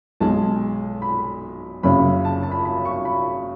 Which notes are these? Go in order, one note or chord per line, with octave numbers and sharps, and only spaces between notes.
B1 B2 G#3 A5
B5
F#1 F#2 C#3 B5
A5
A5
B5
B5
C#6
B5